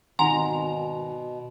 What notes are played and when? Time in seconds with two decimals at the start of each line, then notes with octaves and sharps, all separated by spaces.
0.19 G#1 B2 D#3 F#5 G#5 A#5 C6